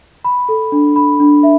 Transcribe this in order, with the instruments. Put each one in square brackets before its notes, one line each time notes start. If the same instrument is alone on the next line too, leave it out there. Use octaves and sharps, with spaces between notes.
[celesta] B5
A4
D4
B5
D4
E5